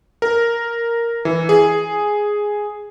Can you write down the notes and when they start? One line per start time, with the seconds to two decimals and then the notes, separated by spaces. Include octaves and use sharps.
0.22 A#4
1.25 E3
1.49 G#4